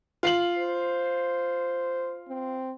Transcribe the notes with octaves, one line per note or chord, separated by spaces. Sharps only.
F4 C7 F#7
C5
C4